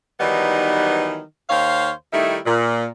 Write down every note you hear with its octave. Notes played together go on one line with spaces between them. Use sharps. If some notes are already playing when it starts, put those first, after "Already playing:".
D#3 E3 F#3 G3 B3 D#4
D#2 C5 C#5 F5
D#3 G3 A3 D#4 E4
A#2